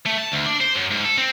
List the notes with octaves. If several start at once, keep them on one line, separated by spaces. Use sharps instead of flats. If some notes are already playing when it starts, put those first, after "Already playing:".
A3
A5
D2
D4
C5
F#2
G#2
A4
C4